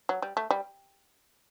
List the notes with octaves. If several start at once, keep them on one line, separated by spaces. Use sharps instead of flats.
F#3
G3
A3
G3